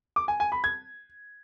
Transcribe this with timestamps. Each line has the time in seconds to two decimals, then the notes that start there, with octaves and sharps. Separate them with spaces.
0.16 D6
0.28 G#5
0.40 G#5
0.52 B5
0.64 G#6